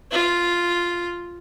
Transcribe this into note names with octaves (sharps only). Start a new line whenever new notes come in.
F4